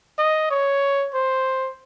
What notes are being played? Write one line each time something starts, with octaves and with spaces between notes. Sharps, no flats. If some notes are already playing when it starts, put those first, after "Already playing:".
D#5
C#5
C5